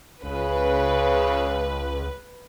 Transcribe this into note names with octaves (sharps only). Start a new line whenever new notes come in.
C#2 C#3 B4